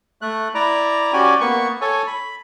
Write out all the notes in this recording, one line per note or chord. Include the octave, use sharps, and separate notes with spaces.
A3 F#6
E4 D5 A#5
C#4 F#4 G4 D5 G#5
A#3 B3 C#6
A4 C#5 G#5
B5